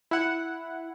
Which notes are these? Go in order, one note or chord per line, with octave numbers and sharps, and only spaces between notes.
E4 F#5